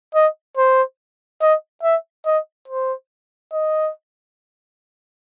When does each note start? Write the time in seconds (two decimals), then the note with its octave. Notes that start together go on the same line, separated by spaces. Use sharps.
0.15 D#5
0.57 C5
1.42 D#5
1.83 E5
2.26 D#5
2.68 C5
3.53 D#5